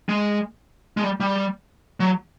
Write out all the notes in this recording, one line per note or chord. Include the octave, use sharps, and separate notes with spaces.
G#3
G#3
G3
G3
F#3